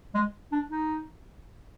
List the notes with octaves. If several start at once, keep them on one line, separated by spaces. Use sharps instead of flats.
G#3
D4
D#4